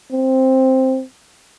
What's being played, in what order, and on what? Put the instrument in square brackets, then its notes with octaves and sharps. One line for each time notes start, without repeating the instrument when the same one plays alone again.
[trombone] C4